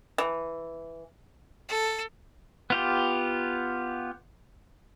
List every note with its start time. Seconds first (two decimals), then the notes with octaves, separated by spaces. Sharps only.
0.18 E3
1.69 A4
2.70 B3 F4 G4